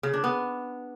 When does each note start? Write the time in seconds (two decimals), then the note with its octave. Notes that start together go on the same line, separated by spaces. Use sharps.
0.03 C#3
0.14 D4
0.24 B3